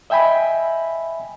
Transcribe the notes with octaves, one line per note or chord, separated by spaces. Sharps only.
D#5 E5 G5 G#5 B5